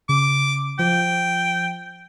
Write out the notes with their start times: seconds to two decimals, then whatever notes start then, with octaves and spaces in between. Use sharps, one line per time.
0.09 C#3 D6
0.79 F3 G5